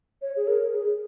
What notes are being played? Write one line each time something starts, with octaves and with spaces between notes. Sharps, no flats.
C#5
G#4
A#4
G#4